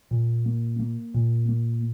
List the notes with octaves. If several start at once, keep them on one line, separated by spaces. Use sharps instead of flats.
A#2
A#3
A#3
A#2
A#3